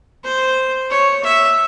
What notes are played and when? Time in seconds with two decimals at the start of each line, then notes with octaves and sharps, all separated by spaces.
0.24 C5
0.90 C#5
1.24 E5